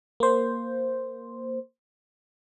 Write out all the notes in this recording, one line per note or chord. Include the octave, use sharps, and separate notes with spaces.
A#3 C5